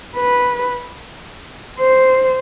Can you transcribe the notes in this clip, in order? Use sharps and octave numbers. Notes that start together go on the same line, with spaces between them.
B4
C5